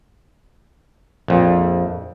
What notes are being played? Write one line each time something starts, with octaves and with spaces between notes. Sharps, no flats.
A#1 F2